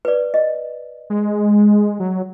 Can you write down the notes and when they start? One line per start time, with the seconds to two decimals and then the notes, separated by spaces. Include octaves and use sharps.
0.05 B4 D5
0.34 D#5
1.10 G#3
2.00 F#3